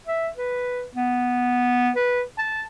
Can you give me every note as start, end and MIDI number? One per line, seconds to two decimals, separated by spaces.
0.07 0.28 76
0.37 0.84 71
0.95 1.90 59
1.96 2.22 71
2.39 2.62 81